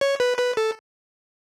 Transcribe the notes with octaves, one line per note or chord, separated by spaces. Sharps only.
C#5
B4
B4
A4